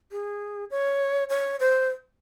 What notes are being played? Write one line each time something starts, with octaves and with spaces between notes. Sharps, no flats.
G#4
C#5
C#5
C5